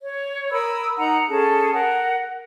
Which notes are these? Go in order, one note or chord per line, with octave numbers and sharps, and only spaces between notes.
C#5
A#4 B5 D#6 E6
D#4 F#5 A#5
C#4 G#4 A4 A5
A#4 F#5